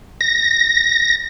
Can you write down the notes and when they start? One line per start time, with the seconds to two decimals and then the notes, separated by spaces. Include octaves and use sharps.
0.21 A#6